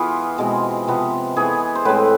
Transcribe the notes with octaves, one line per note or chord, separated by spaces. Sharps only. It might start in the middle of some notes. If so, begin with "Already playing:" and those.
Already playing: E3 B3 F4 G#4
B2 G#3 C4
C3 F3 B3
E3 B3 G#4
C5
A2 G#3 C4 B4